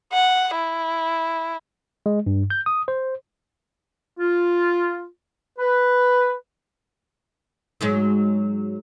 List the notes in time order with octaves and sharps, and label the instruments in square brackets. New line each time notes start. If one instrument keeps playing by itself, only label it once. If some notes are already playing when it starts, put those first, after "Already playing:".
[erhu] F#5
E4
[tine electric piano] G#3
G2
G6
D#6
C5
[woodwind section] F4
B4
[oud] G#2 F#3 G#3